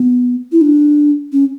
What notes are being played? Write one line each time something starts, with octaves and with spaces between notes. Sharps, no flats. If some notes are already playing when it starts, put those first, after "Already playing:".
Already playing: B3
E4
D4
C#4